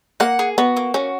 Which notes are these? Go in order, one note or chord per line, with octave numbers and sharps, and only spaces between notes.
A#3 F#5
G#4
B3 F#4
A#3
C#4 F#4